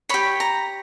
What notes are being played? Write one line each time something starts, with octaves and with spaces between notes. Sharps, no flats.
G4 C#5 B5
A#5